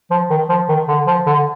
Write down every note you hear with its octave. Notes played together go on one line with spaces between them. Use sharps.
F3
D#3
F3
D#3
D3
F3
D3